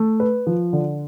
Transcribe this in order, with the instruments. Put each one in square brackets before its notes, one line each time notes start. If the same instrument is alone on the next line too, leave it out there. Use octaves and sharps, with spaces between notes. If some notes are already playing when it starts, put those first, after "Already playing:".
Already playing: [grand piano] A3
B4
F3
D3